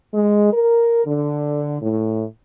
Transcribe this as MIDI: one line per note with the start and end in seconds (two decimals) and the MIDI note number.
0.13 0.52 56
0.53 1.03 70
1.05 1.79 50
1.81 2.24 45